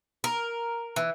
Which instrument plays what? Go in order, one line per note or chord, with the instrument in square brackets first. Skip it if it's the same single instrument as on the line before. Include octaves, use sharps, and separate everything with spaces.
[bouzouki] A#4
E3